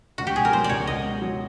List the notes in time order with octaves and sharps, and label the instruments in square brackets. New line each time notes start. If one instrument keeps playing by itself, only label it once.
[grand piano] C#2 [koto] F#4
[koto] G4
[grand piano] B2 [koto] G#4
[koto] A#4
[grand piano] F#3 [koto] C5
[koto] D5
[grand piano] C#2 [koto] C#5
[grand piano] C#2 [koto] D#5
[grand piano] B2
F#3